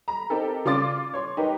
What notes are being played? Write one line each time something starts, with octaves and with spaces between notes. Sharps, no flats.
A#5 B5
C4 D#4 G4 A4 A#4
C#3 F4 D5 C6 D6 A6
C#5 C6
D#4 G4 A#4 B4